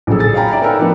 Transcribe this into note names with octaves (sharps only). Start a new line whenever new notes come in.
A#1 C#3 F#3 G#4 A4
G#4 A6
C#5 F5 G5 A#5 B5
D5 E5 G#5 A#5
B3 D#4 A4 A#4 G5
F3 A3 B3 D4 F4